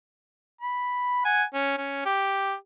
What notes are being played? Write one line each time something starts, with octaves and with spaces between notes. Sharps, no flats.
B5
F#5 G#5
C#4
C#4
G4